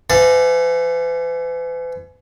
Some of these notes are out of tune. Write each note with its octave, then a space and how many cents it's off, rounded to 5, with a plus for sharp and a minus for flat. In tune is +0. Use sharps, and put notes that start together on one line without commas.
E3 +40 F#5 -30 A5 +10